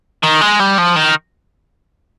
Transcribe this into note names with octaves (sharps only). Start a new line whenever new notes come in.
D#3
G#3
G3
F3
D#3